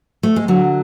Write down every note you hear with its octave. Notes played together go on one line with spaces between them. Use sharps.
A3
G#3
D3 F#3